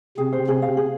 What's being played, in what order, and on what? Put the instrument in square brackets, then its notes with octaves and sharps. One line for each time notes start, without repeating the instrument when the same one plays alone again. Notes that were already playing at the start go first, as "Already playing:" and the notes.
[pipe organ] C3 C4 [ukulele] G#4
[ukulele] C5
[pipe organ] C3 C4 [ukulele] G#4
[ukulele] F5
G#4